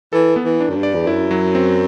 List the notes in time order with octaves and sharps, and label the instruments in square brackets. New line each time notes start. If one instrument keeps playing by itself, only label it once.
[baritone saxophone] E3 [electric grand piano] A4
[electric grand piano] B3
[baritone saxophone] E3
[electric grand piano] D4
[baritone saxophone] F#2
G2
[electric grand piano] D5
[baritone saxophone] E2
[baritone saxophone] F#2 [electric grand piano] E4
[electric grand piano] F#3
C4